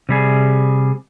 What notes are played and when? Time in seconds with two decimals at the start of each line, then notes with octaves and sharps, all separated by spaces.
0.09 C3 G3 G#4